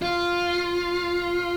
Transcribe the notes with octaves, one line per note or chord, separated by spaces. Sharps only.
F4